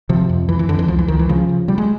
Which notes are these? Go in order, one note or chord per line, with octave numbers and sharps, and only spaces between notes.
C3 F3
F2
F2 E3
E3
F2 D3
E3
C#2 F3
E3
C#2 D#3
E3
C#3 F3
C#3
C#3 G3
G#3